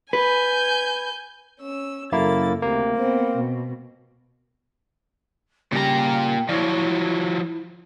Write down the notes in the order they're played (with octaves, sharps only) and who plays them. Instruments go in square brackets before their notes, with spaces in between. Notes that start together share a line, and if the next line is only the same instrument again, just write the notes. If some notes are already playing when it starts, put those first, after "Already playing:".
[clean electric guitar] B4 [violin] G#5 G6
[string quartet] C#4 E6
[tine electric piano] F#2 A#3 E4 [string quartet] C#3 A4 A6
[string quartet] D2 C3 [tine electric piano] A#3
[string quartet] B3 C4 C5
B2
[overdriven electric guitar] A#2 A#5 [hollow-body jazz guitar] C#3 G3 G4 [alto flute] G5
[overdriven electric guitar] F3 F#3 [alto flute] E4 [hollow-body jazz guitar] D5